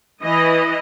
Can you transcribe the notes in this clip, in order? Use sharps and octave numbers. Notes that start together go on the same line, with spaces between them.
E3 D#5